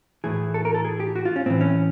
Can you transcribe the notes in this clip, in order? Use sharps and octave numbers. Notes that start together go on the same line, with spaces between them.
A2 E3 G#4
A4
A#4
A4
G#4
G4
F#4
F4
C#4
A2 E3 C4
C#4